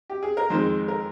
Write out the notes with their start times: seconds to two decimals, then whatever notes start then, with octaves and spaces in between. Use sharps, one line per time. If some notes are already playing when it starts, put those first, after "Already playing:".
0.10 G4
0.23 G#4
0.37 A#4
0.50 F2 D#3 G#3 C5
0.88 A#4